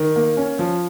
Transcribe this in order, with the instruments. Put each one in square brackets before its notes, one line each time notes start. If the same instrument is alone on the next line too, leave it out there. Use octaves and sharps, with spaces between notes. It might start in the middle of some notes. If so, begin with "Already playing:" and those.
Already playing: [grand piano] D#3
A#3
C#4
F3